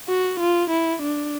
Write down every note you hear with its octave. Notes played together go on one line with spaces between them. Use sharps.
F#4
F4
E4
D4